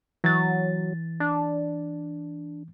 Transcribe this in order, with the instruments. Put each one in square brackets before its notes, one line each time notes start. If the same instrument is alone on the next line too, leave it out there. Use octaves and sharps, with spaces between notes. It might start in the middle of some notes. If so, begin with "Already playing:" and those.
[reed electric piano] E3 A6 [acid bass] F#3
[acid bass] D4